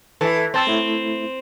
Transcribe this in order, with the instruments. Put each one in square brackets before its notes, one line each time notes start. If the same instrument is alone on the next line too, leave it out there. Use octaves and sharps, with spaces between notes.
[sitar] E3 [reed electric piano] A4 E5
[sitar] C4 [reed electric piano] G5 A5 E6
[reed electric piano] A3 E4